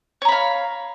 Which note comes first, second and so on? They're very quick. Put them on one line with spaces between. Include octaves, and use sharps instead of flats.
C#5 A#5 B5 F5